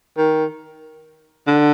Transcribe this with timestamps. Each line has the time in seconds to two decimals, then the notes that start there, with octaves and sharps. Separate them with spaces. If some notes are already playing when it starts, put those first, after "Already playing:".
0.18 D#3
1.47 D3